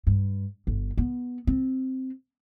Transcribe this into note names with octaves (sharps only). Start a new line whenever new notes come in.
G2
G1
B3
C4